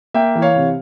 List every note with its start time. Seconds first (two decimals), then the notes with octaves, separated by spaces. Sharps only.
0.14 A#3 E5 G5
0.35 E3
0.42 C#5 F5
0.56 C3